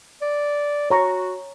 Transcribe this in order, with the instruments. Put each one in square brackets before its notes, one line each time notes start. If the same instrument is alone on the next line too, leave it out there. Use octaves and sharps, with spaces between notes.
[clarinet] D5
[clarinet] F#4 [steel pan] C#5 A#5 C#6